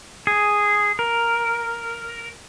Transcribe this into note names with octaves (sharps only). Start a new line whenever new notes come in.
G#4
A#4